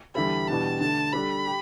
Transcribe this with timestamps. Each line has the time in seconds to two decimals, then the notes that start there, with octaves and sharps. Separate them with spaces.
0.15 E2 D3 G3 E4 A4 B5
0.48 E2 B2 G3 D4 G4 A5
0.80 D3 A3 D4 A5
1.13 G3 D4 A4 B5
1.47 G4